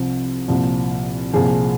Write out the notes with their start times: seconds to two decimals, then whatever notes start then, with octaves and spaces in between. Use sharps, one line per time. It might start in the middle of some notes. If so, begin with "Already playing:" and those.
Already playing: C2 C3 F3 C4
0.48 C2 A#2 F3
1.33 C2 A#2 F3 G#4